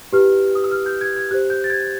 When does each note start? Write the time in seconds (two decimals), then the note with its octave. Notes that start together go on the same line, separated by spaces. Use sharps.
0.13 E4 G4 B4 F6
0.55 D#6
0.64 E6
0.72 F6
0.86 G6
1.01 G#6
1.16 G#6
1.31 G4 C5 F#6
1.50 G6
1.64 A6
1.70 G#6